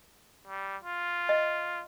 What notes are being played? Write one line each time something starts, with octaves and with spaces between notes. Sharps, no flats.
G3
F4
D#5